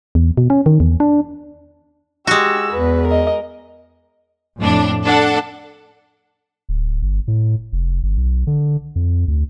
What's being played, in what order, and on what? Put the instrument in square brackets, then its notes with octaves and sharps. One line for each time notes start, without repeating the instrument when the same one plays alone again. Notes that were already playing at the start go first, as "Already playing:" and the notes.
[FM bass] E2
B2
C#4
D#3
E2
D4
[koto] G#3 F#4 [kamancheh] G4 E6
[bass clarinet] E2 [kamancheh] B4
[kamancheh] A#4 D#5
[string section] F2 A2 D4
D4 A4 F#5
[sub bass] D1
G1
A2
F1
G1
B1
D3
F2
D2